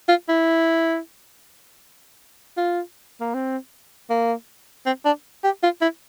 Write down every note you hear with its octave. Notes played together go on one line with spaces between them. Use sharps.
F4
E4
F4
A#3
C4
A#3
C4
D4
G4
F4
E4